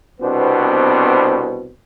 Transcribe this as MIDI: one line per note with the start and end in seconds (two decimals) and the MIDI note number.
0.21 1.70 36
0.21 1.70 47
0.21 1.70 59
0.21 1.70 60
0.21 1.70 62
0.21 1.70 72